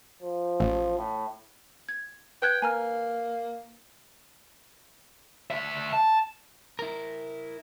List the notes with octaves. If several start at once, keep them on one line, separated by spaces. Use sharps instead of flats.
F3
A1
A2
G#6
B4 G5 F#6 G#6
A#3 G#5 A#5 F6
D2 E5
A5
E4 A#4